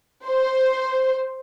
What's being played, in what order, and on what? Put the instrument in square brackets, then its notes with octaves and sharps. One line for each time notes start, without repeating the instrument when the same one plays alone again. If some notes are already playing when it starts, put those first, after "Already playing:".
[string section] C5